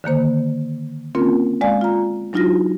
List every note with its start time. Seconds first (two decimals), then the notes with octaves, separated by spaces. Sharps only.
0.04 D3 D#3 A#3 C5
1.15 A#3 C4 C#4 F4 A#4
1.61 G#3 D5 F5 G#5
1.81 F4 A#5
2.33 F#3 D4 D#4 F4 F#4 A#6